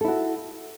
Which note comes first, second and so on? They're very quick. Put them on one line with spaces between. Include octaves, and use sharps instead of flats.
A4 E4 F#4